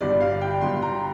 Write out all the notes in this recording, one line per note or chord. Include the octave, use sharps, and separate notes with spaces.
G1 G2 G3 D5
F5
G5
G1 G2 G3 C6
A#5